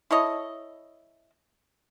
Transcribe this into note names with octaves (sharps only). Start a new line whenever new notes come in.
E4 A4 C#5 D#5